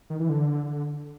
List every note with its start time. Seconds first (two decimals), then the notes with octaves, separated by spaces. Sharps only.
0.10 D#3
0.19 E3
0.29 D3